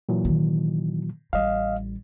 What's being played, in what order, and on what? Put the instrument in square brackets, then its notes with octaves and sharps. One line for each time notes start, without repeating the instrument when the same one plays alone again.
[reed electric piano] A#2 E3 F#3
[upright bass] C3 D#3
[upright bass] A1 G3 [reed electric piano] D#5 F5